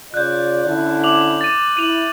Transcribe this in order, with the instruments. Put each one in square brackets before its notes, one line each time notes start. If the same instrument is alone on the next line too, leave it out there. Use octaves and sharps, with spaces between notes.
[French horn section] C#3 F4 D5 [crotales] F#6 G6
[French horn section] D3 C#4 E4
[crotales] D6 F7 F#7
A6 D#7
[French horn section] E4 [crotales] D#7 F7 F#7